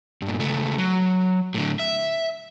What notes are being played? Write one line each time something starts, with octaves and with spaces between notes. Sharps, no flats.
G2 A#2
C#2 A3
F#3
A2 D3
E5